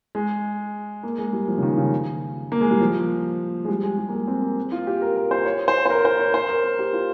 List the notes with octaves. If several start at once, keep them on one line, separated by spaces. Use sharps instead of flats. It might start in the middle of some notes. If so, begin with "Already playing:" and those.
G#3
A#3
G#3
G3
F3
C#3
D#3
C#3
A#3
G#3
G3
F3
G#3
G3
G#3
G3
A#3
G#3
C4
A#3
F4
G4
A#4
A#4
C5
C#5
C5
C5
A#4
C5
C#5
C5
A#4
A#4
G4
F4